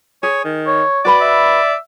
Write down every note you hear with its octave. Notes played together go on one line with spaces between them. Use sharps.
G#4 C#5
D#3
C#5
F#4 B4 D5 B5
E5